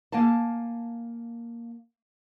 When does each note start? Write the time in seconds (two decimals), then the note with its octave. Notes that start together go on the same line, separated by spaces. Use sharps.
0.12 A#3 F5 G#5 A5